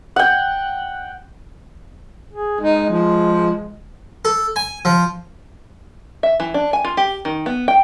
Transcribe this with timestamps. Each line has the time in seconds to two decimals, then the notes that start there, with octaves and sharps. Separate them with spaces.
0.16 F#5 G5
2.33 G#4
2.61 G#3 D#4
2.90 F3
4.25 A4
4.56 G#5
4.85 F3
6.23 E5
6.40 E3
6.54 D4
6.73 G#5
6.85 F4
6.97 G4
7.25 D#3
7.46 B3
7.68 G5